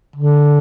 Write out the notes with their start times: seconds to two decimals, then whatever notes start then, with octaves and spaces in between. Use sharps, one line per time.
0.16 D3